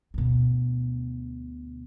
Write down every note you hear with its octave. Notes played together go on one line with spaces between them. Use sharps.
D2 B2